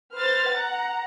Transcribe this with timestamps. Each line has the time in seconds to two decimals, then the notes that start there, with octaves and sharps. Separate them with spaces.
0.15 B4 C5 F6 A6
0.53 F#5 A#5